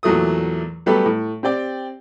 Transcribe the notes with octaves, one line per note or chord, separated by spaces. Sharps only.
E2 A#2 F#3 A3 D#6
F#3 G3 A3 B3 G4 A4
A2
C4 G4 D5 G5